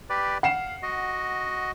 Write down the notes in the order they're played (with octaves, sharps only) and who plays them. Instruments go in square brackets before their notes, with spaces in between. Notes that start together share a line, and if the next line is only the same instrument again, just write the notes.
[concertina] G4 B4 D5
[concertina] F5 [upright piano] F#5 C7 E7
[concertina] F#4 D#5